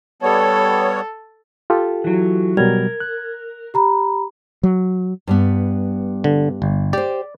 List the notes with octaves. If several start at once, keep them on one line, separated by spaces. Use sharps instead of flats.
G3 B3 A4 C#5
F4 G4 A4
E3 F#3
B2 F#3 G3 A#4 G#6
F#6
G4 A#5 B5
F#3
G2 G3 B3
D3
G1
G4 C5 D5